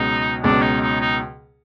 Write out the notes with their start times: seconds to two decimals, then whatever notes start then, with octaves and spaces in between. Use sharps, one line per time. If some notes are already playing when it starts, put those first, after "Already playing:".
Already playing: C#2 B2 F#3 D#4
0.44 C#2 B2 F#3 D4
0.62 D#4
0.81 D#4
1.01 D#4